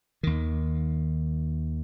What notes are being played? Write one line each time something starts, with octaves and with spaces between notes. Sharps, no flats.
D#2 D#3